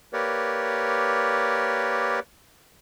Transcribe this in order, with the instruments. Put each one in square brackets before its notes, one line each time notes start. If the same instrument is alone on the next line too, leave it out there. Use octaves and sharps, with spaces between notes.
[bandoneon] A#3 G4 A#4 B4 C#5 D5